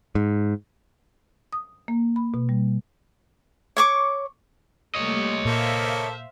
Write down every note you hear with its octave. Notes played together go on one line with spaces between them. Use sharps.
G#2
D#6
A#3
B5
B2
G3
C#5 C#6 D6
G3 A3 A#3 C#5 D#5
A#2 A#3 A4 C5 E5 F5